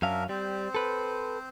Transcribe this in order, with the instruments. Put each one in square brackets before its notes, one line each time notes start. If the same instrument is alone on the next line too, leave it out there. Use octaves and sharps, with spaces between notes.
[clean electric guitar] F#2 C#4 F5 [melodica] D4 A#4 E5
[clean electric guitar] G3 [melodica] C4 C5
[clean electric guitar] A4 B4